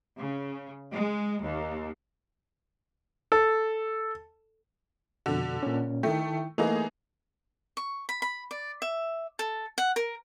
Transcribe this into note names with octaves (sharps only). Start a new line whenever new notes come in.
C#3
G#3
D#2
A4
F2 B2 D3 F#4
A#2 C#4
D#3 A3 E4 G5
E3 A3 A#3 D#4 G#4
C#6
B5
B5
D5
E5
A4
F#5
A#4